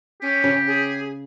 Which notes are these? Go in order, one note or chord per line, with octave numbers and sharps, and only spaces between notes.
C#4 G4
C#3
G#4